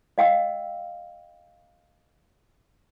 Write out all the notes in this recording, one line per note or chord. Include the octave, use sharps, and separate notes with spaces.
D#5 F5 G5 E6